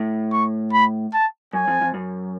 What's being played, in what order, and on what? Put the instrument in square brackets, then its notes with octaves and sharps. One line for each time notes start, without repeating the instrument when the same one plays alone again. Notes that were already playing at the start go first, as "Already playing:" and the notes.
Already playing: [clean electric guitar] A2
[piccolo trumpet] C#6
B5
A5
[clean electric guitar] F#2 [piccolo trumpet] G#5
[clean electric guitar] F2
F2
F#2